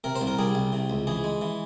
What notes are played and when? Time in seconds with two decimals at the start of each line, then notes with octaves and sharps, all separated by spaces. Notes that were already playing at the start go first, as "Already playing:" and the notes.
0.04 C3 A#4
0.15 C5
0.21 C2
0.27 A#4
0.39 G3 G#4
0.55 C2
0.72 C3
0.90 C#2
1.07 E3 G#4
1.24 G#3
1.41 E3